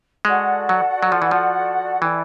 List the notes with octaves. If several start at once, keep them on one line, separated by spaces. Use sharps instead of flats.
G#3 F#4 A4 D5 F#5
F#3
F#3
F3
E3
F3
E3 E4 A4 D5 G5